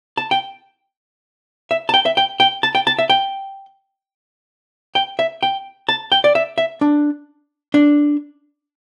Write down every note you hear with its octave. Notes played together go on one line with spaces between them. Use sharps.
A5
G5
E5
A5
G5
E5
G5
G5
A5
G5
A5
E5
G5
G5
E5
G5
A5
G5
D5
E5
E5
D4
D4